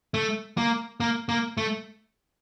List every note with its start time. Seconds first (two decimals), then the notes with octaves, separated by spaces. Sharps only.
0.14 A3
0.57 A#3
1.00 A#3
1.29 A#3
1.57 A3